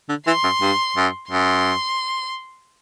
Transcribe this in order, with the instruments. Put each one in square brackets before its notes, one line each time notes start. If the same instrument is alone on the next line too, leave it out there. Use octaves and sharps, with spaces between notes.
[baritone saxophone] D3
[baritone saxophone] E3 [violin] C6
[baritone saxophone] F#2
G2
F#2
[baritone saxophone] F#2 [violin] C6